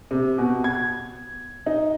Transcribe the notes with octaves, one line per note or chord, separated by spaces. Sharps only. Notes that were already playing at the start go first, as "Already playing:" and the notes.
C3
B2
G#6
D#4